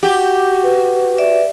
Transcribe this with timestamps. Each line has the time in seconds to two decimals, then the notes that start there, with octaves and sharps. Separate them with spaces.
0.03 F#4 G4 F#5
0.63 B4
1.18 D5 E5